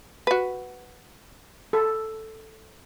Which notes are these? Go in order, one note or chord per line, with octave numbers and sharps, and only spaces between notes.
F#4 B4
A4